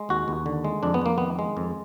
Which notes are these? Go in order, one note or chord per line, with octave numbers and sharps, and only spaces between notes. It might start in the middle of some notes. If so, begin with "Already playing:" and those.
Already playing: G#3
D#2 F#4
D#2
D3
G#3
F2 D4
B3
F2 A#3
D#3 B3
G#3
F2